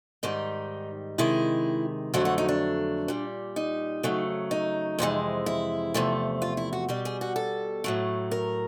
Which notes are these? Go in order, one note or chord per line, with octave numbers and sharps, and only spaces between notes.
G#2 D#3 G3 D#4
C3 D#3 G#3 E4
F2 D3 F#3 A3 F#4
F#4
D#4
D4
A#2 G3
D#4
F2 C#3 F#3 A3
D#4
F2 C3 E3 G#3
E4
E2 C3 F3 A3
F4
E4
F#4
B2 G3 G4
G#4
F#4
A4
A2 F#3 A3
A#4